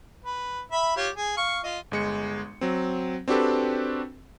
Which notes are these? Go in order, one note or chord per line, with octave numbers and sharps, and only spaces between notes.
B4
E5 B5
F4 G4 C#5
G#4
F5 C#6
F4 D#5
G1 G#3 C#7
F#3 C4
C4 D4 F#4 G4 A4 B4